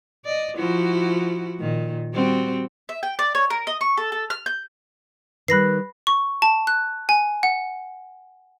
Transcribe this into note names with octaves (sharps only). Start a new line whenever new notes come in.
D5 D#5
F3 E4 F#4
A#2 D#3
G3 C4 F#4
E5
G5
D5
C#5
A#4
D#5
C#6
A4
A4
F6
G6
D#3 G3 B4 B5 F#6 A#6 C7
C#6
A5
F#6
G#5
F#5